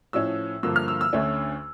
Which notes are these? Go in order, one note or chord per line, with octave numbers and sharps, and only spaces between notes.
A2 F3 C#4 E6
G2 D3 F3 A#3 E6
F6
E6
E6
D2 D3 A3 C#4